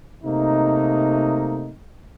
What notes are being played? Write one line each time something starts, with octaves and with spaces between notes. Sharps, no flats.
C3 A3 A#3 D#4